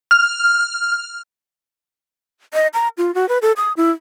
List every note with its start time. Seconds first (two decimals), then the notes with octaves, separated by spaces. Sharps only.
0.11 F6
2.54 D#5
2.74 A#5
2.98 F4
3.15 F#4
3.29 B4
3.42 A4
3.57 D#6
3.77 E4